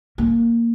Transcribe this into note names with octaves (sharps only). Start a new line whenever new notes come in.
A#3